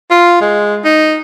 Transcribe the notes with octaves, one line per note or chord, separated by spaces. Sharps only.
F4
G#3
D#4